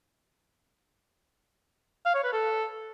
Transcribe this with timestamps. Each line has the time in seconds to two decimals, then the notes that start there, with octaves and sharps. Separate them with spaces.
2.05 F5
2.15 C#5
2.24 B4
2.33 A4